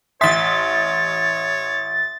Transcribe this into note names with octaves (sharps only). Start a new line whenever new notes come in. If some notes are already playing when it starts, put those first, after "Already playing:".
A1 C#5 E5 C6 D#6 A6 B6